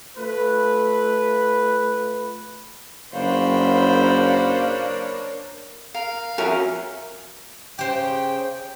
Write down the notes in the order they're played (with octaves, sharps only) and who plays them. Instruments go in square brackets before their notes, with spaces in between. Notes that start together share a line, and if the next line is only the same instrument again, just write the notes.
[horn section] A3 F4 B4
[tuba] F#1 [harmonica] A#3 D4 C#5 [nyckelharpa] C5 B5 [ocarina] F5
[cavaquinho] A#4 [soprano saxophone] F5
[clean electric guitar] F2 F#4 E5 [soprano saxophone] C#4 [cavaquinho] A#4
[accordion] C#3 G5 [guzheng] G4 C5